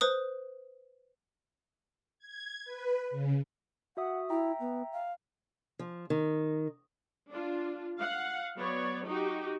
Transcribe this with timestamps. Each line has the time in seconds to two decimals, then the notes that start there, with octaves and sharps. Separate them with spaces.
0.01 B4 C5 D#6
2.19 G#6
2.64 B4
3.10 C#3
3.97 F#4 E5 F#5 D#6
4.30 E4 E5 G5 A#5
4.60 B3
4.92 F5
5.79 F3
6.10 D#3
7.30 D4 F4
7.99 F5 F#5
8.57 F#3 B3 C#5 D5
9.06 D#4 F#4 G4